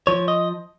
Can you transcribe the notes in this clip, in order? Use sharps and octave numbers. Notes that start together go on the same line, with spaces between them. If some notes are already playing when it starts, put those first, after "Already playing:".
F3 C#5
D#5